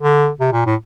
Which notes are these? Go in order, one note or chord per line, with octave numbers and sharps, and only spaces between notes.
D3
C3
A#2
A2